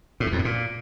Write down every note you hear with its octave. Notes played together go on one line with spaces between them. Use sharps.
A2
E2
F2
A2
A#2